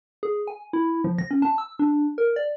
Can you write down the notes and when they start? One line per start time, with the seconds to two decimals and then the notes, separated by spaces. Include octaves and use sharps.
0.23 G#4
0.47 G#5
0.73 E4
1.04 F3
1.19 A#6
1.31 C#4
1.42 A5
1.58 E6
1.79 D4
2.18 A#4
2.36 D5